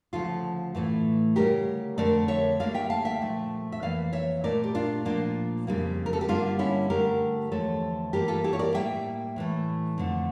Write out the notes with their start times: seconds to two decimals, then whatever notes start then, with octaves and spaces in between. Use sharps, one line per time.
0.13 D2 C#3 F3 F4 A4
0.75 A2 E3 A3
1.36 D2 C#3 G3 G4 A#4
1.98 F2 D3 A3 A#4 D5
2.28 C#5 E5
2.59 D2 D3 G3 A#3 D5 F5
2.74 E5 G5
2.90 F5 A5
3.05 E5 G5
3.20 A#2 F3 A3
3.72 E5
3.82 F2 E3 A#3 D5 F5
4.13 C#5 E5
4.44 A#2 A3 A#4 D5
4.64 G4
4.75 D4 F4
5.05 A#2 F3 A#3 D4 F4
5.67 F2 C#3 G3 A#3
6.06 A#4
6.13 A4
6.21 G4
6.28 G2 D3 G3 A#3 D4 F4
6.59 C#4 E4
6.90 G2 D3 A3 G4 A#4
7.52 E2 D3 F3 A3 A4 C#5
8.13 G2 E3 A#3 G4 A#4
8.28 F4 A4
8.44 E4 G4
8.53 C#5
8.59 A#4 D5
8.75 A2 G3 A#3 E5 G5
9.36 A2 E3 A3
9.98 F2 D3 A3